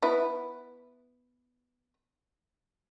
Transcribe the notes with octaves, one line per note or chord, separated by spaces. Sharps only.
B3 E4